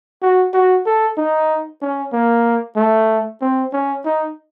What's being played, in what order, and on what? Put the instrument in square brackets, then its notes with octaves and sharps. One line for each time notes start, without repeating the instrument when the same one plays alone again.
[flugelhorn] F#4
F#4
A4
D#4
C#4
A#3
A3
C4
C#4
D#4